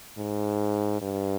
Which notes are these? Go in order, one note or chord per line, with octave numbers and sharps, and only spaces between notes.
G#2
G2